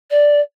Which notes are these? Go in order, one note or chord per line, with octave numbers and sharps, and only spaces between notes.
D5